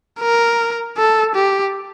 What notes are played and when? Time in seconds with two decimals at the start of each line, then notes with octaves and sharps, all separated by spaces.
0.20 A#4
0.97 A4
1.35 G4